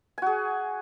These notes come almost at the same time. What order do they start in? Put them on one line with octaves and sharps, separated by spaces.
G#5 F#4 G#4